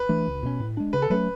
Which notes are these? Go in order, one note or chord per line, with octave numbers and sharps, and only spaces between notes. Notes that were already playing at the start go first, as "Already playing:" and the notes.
Already playing: B4
E3 A3 D4
C#2
B2 A3 C#4
A2
G#3 D4
C#3 B4
A4
F#3 A3 C#4 B4